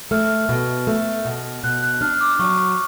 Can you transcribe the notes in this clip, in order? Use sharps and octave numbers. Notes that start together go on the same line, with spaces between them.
A3 F6
B2
A3
B2
B2 F#6
F#6
D4 F6
D6
F#3 C#6